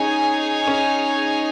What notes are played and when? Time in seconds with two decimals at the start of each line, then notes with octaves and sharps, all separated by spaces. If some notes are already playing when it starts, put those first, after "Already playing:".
Already playing: C#4 D#4 G#4 C#5 G#5
0.67 C#4